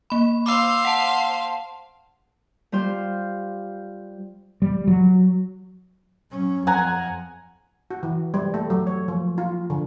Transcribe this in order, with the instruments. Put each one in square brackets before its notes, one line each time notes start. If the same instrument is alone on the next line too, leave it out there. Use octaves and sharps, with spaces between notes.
[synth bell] A#3 B5
[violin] C5 F5 [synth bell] D6 E6
[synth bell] F#5 A5
[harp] G3 F4 C5
[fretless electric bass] G3
F#3
[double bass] F#3 C#4
[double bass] F2 F3 [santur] F#5 G#5 A#5
[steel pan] F#4
E3
G3
A3
F#3
C#5
F3
F4
D3